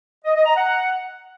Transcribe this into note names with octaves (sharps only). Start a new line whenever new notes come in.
D#5
D#5
A#5
F#5